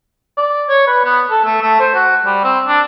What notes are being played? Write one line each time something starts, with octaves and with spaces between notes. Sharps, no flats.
D5
C#5
B4
B3
A4
A3
A3
C5
F#4
G3
C4
D4